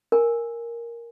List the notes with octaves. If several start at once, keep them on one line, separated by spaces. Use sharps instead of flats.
A#4 G#5